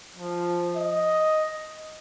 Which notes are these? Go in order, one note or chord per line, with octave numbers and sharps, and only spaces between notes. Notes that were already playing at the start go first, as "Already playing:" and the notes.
F3
D#5